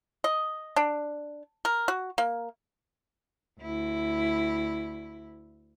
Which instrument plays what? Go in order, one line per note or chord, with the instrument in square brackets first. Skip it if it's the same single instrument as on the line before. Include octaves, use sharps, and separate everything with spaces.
[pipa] D#5
D4
A#4
F#4
A#3
[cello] D2 E4